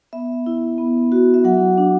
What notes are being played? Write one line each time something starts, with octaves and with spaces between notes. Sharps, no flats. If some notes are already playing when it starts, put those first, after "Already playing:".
B3 E5
E4
B3
F#4
E5
F#3 F#5
D4